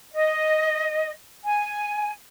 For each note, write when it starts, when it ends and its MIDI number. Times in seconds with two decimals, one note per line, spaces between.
0.12 1.11 75
1.44 2.13 80